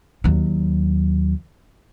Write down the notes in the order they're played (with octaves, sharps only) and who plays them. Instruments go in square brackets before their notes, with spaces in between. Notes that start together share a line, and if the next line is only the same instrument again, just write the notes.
[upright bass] D#2 F#3